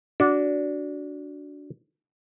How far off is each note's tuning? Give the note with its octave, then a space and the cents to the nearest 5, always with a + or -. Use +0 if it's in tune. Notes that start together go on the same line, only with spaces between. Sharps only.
D4 -15 F#4 +0